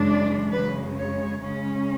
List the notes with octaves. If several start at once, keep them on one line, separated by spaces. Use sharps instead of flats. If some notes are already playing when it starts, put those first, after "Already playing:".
Already playing: F#2 C#3 E3 G#3 D4
D5
F#2 C#3 G#3 B4
C#5
C#3 G#3 C#4